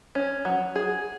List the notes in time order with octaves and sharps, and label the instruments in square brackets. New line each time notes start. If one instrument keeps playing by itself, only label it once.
[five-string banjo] C#4
F#3
G#4